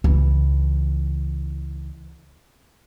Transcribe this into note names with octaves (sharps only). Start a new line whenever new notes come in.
C#2 E3